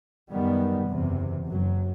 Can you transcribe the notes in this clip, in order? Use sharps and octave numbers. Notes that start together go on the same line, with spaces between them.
F#2 D#3 G3 B3
F#1 E2 C3
F#1 F#2 F#3